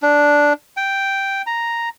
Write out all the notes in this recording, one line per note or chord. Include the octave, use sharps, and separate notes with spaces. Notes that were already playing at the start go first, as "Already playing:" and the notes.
D4
G5
A#5